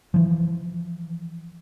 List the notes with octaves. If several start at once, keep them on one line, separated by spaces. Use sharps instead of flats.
E3 F3